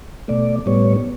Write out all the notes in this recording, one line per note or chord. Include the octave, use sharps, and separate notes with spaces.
B2 A3 D5
A2 G3 B3 C#5